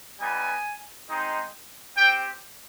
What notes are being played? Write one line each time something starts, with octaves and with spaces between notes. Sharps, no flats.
G3 B3 D#4 G4 G#5
G#3 C4 D#4
C4 G4 G5